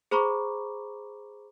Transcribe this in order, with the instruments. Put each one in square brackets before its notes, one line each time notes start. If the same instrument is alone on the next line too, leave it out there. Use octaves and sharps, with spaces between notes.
[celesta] G#4 C5 A#5 B5 C#6 D6